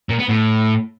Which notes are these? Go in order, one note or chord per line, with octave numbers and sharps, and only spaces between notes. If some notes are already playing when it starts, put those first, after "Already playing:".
A#2
B3
A2